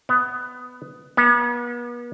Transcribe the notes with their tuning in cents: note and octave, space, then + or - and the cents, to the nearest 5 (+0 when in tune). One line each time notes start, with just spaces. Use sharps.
B3 +15
B3 -40